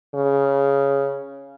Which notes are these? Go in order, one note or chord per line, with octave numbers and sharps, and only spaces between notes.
C#3